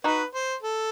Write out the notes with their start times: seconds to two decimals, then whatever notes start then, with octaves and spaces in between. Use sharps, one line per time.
0.04 D#4 F#4 B4
0.34 C5
0.62 A4